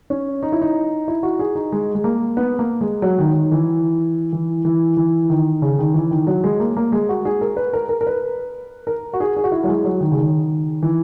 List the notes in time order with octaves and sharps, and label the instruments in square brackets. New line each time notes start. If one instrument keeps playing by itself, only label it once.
[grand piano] C#4
D#4
E4
D#4
E4
F#4
G#4
D#4
G#3
G#3
A#3
B3
A#3
G#3
F#3
D#3
D#3
E3
E3
E3
E3
D#3
C#3
D#3
E3
D#3
F#3
G#3
A#3
A#3
G#3
F#4
G#4
A#4
B4
A#4
A#4
A#4
B4
A#4
F#4
G#4
G#4
F#4
E4
F#3
G#3
F#3
D#3
C#3
D#3
E3